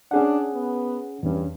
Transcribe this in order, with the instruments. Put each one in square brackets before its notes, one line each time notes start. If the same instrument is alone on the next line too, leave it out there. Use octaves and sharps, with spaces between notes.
[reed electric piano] C#4 G#4 F#5 [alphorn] D4
[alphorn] B3
[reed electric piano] E2 C#4 [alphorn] G2